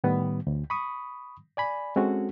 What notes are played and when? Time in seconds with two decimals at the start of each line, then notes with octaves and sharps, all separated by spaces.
0.04 A2 D#3 G3 B3
0.47 D2
0.70 B5 C#6 D#6
1.57 D5 G#5 B5
1.96 G#3 C4 C#4 F#4 A4